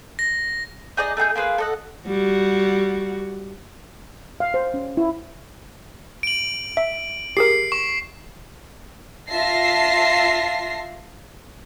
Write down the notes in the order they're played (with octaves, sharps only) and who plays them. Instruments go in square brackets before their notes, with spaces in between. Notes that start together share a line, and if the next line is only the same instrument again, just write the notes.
[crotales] A#6
[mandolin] D#4 G#4 D5 D#5
A3 D#4 G#4 G6
A#3 F4 G#4 B4
A4 D#5 F#5
[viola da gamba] G3 F#4
[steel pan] F5
C5
C#4
E4
[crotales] D7 F#7
[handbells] E5
[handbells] G4 G#4 A#4 [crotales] C7
[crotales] C#6
[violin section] F4 E5 A5 A#6 C7